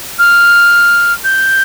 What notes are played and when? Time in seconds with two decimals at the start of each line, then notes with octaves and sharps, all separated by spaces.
0.19 F6
1.24 G6